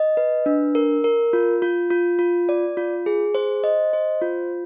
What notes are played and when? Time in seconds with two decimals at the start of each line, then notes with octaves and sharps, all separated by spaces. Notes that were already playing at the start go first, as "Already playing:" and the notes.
Already playing: D#5
0.17 B4
0.46 D4
0.75 A#4
1.04 A#4
1.33 F4
1.62 F4
1.90 F4
2.19 F4
2.49 D5
2.77 F4
3.06 G#4
3.35 C5
3.64 D#5
3.93 C5
4.21 F4